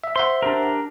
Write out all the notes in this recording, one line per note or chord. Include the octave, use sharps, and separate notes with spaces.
E5
C5 E5 F#5 C6
D4 G4 A#4